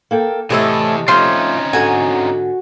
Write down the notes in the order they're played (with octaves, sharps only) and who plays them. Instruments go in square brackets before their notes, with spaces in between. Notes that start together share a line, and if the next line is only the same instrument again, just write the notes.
[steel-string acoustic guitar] A#3 A4 G5
[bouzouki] A2 A3 A4 [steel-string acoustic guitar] C3 D#5 [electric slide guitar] E3 G#4
[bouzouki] F3 A3 [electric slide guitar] C4 C#4 D#4 [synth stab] C5 C6
[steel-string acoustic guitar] G#2 D3 [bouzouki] F#4 G#5